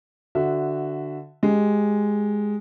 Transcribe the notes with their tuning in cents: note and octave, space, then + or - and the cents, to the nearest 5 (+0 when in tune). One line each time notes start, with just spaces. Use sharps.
D3 +0 F#4 +0 E5 +0
G#3 +0 G4 +0